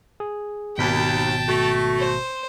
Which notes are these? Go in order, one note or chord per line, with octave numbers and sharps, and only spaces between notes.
G#4
G#1 D#2 B2 G5 A5 B6
A3 F#4
C5